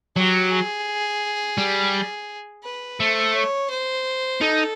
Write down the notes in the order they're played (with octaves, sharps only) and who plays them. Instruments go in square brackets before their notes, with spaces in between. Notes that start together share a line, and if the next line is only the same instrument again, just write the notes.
[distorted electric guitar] F#3 [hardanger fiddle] G4
[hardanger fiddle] G#4
[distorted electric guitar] G3
[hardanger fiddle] B4
[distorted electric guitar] A3 [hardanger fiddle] C5
[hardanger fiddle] C#5
C5
[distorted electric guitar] D#4 [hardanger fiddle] A4